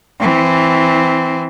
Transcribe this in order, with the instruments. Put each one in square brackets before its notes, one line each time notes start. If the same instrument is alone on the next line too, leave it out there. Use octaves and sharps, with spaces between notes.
[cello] E3 C4